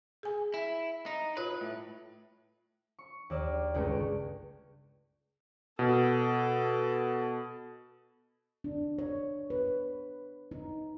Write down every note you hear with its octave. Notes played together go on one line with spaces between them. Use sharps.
G#4 G#5
E4
D#4
F4 B4 C#5
A2
C#6
D#2 D5 E6
G1 C#2 G#3 A3 D7
B2 A4
D4
C#5
B4
D#4